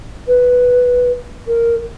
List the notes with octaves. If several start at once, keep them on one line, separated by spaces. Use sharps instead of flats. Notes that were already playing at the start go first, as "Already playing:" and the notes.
B4
A#4